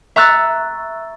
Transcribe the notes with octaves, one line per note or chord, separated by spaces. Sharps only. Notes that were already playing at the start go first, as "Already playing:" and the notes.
E5 A#5 C#6 E6 F#6 A6